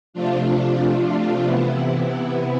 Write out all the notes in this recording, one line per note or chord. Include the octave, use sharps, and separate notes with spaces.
C3 F3 A3 D4 F4
C3 E3 B3 E4